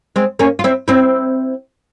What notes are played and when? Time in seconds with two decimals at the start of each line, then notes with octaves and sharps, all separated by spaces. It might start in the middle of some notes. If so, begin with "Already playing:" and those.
0.16 G#3 C4
0.39 A#3 C#4
0.59 F4
0.64 C4 E4
0.88 C4 E4